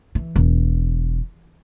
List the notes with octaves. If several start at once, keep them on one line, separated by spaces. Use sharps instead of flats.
E3
E1